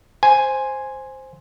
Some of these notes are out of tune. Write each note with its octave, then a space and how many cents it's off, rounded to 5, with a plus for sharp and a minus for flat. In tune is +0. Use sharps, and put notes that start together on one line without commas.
C5 +5 G#5 +0